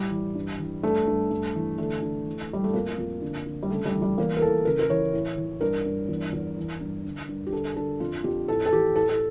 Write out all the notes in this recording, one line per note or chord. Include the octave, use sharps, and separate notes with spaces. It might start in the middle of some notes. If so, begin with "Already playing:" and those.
Already playing: A2 G3
E3
G2
E3
G2 A3
G2
G2
E3
D3 A3
D3
E3
A2 G3
A3
F2 A#3
F2
D3
D3
G3
C#3 A3
G3
E3
G3
E2 A#3
A#4
E3 A4
C#3 A#4
A#4
E3 C#5
A2
E3
G2 A#4
G2
E2
E2
E3
G2
D3
G2
G4
D3 A4
D3 A4
F2 F4
F2 G4
A2 A4
A4
E3 G4
A2 A4
A4